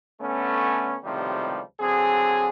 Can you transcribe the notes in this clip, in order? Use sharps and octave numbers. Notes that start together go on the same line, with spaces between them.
D3 A3 B3 C#4
C#2 A2 C3 D#3 F3 G3
D3 F#3 C4 G#4